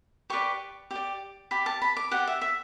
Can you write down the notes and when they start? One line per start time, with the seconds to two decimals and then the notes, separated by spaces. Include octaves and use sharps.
0.30 G4 B4 D5 C#6
0.91 G4 D5
1.51 G4 D5 B5
1.66 A5
1.82 B5
1.97 D6
2.11 G4 D5 F#5
2.27 E5
2.42 E5